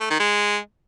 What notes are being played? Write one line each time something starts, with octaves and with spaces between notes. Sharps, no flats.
A3
D#3
G#3